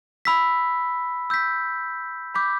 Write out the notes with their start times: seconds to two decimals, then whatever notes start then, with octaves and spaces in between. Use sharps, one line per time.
0.25 B5 E6 B6
1.30 E6 G6 B6
2.35 B5 D6 G6 B6